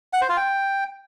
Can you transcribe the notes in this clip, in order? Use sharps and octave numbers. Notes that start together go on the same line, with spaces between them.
F#5
C5
F4
G5